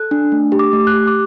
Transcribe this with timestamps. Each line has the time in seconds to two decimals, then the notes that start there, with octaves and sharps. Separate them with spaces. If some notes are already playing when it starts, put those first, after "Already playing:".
Already playing: A4 F#6
0.11 D4
0.32 A3
0.52 G4
0.59 D6
0.73 A3
0.87 F#6
0.93 G4
1.07 D6